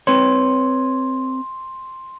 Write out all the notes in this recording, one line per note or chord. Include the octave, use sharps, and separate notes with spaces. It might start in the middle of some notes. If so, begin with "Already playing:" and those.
C4 B4 C#5 C6